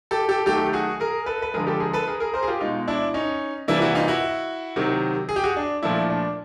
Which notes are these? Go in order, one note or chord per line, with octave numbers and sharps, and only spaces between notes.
G4 A4
G4 A4
D#3 F#3 A3 G4 A4
F#4 G#4
G#4 A#4
A4 B4
B4
D3 F3 G#3 G#4 A#4
G4 A4
G#4 A#4
A4 B4
G#4 A#4
G#4 A#4
A#4 C5
G#4
F4 G4
B2 G#3 D#4 F4
D4 E4
C#4 D#4
C3 E3 G3 A#3 D4 E4
E4 F#4
D#4 F4
E4 F#4
C3 D#3 F#3
G#4
G4
F#4 G#4
D4
A#2 F3 A3 D4 E4
D4